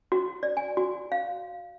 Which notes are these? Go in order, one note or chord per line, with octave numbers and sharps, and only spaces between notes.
F#4
D5
G#5
F#4
F5